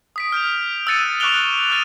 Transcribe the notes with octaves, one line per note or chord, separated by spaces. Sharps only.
D#6 B6 D7
F6 G6 D7 F7
E6 F#6 A6 C#7 D#7
C#6 D6 F#6 D7 F7 G7
D#6 F6 F#6 A6 D7 D#7